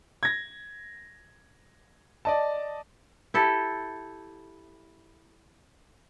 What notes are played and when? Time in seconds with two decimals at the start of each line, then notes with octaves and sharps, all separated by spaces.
0.23 G#6 A#6
2.25 D5 D#5 A5
3.34 E4 G4 A4